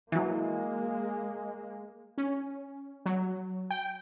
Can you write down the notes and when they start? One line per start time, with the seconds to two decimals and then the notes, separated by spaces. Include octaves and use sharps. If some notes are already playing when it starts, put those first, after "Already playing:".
0.12 E3 F#3 G#3 A#3
2.18 C#4
3.06 F#3
3.70 G5